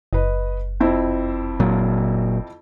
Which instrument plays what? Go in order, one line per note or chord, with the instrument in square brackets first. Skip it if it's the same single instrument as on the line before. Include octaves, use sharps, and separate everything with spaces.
[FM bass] F#1 [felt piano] B4 D#5
[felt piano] F2 C4 E4
[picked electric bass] A#2 F#3